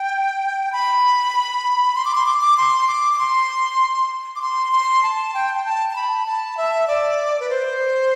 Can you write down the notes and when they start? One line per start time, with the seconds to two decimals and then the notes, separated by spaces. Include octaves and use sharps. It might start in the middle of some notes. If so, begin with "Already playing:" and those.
Already playing: G5
0.72 B5
1.95 C6
2.05 D6
2.15 C6
2.26 D6
2.41 D6
2.57 C6
2.88 D6
3.14 D6
3.18 C6
4.36 D6
4.42 C6
4.72 C6
5.03 A5
5.34 G5
5.55 G5
5.65 A5
5.90 A5
5.96 B5
6.26 A5
6.57 E5
6.88 D5
7.40 B4
7.50 C5